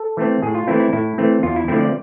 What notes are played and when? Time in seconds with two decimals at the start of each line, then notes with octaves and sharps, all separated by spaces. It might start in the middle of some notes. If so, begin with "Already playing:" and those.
Already playing: A4
0.17 E3 A3 C4
0.42 A2 G#4
0.55 F4
0.67 E3 A3 C4 E4
0.80 E4
0.93 A2 E4
1.18 E3 A3 C4
1.43 E2 F4
1.56 E4
1.68 D3 F3 A3 C4 E4
1.81 D5